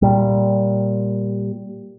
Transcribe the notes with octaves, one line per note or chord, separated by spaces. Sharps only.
A#2 G3